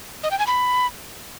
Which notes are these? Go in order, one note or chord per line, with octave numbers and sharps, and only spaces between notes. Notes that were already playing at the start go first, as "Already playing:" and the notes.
D#5
G5
G#5
B5